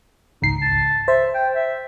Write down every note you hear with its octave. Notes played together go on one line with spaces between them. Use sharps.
G#1 C#2 D#4 C7
A5
C5 E5
G5
E5